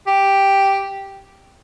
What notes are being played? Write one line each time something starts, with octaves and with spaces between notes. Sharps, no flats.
G4